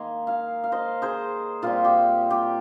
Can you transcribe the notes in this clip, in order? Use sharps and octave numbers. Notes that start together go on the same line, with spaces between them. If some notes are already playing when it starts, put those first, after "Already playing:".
Already playing: D#3 A#3 D#4 G#5 C6
F5 G#5
F5
C5 D#5
G#4 C5
A#2 G3 C4 F4
G4
G4